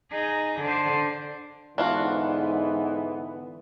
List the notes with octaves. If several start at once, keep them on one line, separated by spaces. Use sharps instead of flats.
D#4 G#4
D3 C5
G#2 D3 E3 B3 D4 F4 F#4